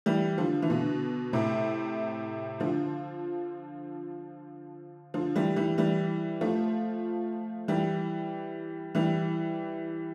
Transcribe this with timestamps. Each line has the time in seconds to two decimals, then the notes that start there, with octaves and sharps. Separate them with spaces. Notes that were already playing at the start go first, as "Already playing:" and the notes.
0.06 E3 G3
0.38 D3 F3
0.62 E3
0.70 B2 D3
1.33 A2 C3
2.60 D3 F3
5.14 D3 F3
5.35 E3 G3
5.56 E3 G3
5.78 E3 G3
6.41 F3 A3
7.68 E3 G3
8.95 E3 G3